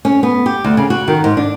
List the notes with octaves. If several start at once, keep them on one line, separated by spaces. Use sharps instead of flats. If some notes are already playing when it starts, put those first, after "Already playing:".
C#4
B3
G4
D2
C#3
F#4
D#3
G#2
D4